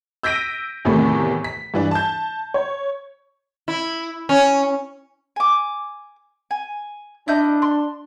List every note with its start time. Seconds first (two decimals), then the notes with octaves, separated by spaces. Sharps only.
0.23 E6 G6 A#6 B6 D7 D#7
0.85 E2 A2 C3 D#3 A3
1.44 B6
1.74 G2 E3 D4
1.91 A5 G6
2.54 C#5
3.68 E4
4.29 C#4
5.36 G#5 D6
6.51 G#5
7.28 D4 E4 D#5 G6
7.62 C6